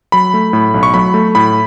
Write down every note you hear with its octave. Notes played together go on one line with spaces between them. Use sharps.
F#3 B5
A3
A2
B1
C#6
F#3 B5
A3
A2 B5